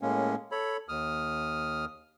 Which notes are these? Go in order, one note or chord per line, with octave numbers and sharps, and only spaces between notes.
A2 G#3 A#3 C#4
A4 C#5 B5
D#2 D#6 F6